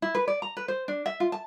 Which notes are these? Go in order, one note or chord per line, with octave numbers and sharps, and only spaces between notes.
E4
B4
D5
A#5
B4
C5
D4
E5
F4
A5